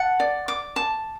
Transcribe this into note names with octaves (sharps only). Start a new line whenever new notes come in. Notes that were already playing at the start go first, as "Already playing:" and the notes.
Already playing: F#5 A5
D5
D6
A5